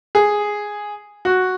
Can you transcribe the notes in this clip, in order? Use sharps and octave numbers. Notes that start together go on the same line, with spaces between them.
G#4
F#4